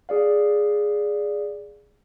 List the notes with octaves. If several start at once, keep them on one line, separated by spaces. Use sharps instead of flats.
G#4 D5 F5